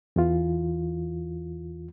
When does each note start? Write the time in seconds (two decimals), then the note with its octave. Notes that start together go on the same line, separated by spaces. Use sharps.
0.16 E2 E3 F4